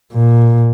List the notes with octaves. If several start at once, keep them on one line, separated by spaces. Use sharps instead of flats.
A#2